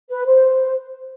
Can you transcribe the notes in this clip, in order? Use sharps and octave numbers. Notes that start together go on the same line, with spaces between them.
B4
C5